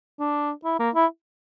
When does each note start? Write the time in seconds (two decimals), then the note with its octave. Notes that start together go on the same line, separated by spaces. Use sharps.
0.20 D4
0.65 E4
0.79 A#3
0.95 E4